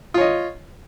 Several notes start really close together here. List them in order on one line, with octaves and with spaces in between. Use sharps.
F4 C#5 D#5